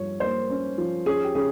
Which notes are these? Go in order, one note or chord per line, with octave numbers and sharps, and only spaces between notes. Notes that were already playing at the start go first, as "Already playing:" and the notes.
Already playing: G2 F3 C#5
A#3 C5
C#4
F3
C#4 G#4
G4
C#3 G#4